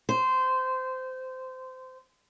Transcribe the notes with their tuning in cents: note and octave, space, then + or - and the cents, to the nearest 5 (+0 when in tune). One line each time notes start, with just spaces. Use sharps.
C5 -20